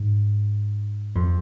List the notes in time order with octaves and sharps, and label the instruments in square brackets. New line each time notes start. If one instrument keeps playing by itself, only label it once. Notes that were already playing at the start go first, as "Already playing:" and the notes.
Already playing: [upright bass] G#2
F2